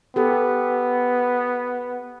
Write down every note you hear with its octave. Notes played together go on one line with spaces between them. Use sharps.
B3 G4 A4